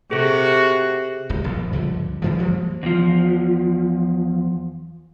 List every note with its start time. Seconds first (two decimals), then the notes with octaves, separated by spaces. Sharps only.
0.11 C3 F#4 G#4 A4
1.29 D1 G1 C#2
1.44 A#1 D#2
1.73 C#2 G2 D3 F3
2.22 F#2 E3 F3
2.38 F3 G3 G#3 A#3
2.83 E2 F3